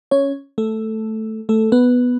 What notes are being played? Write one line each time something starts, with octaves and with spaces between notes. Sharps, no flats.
C#4 C#5
A3 A4
A3 A4
B3 B4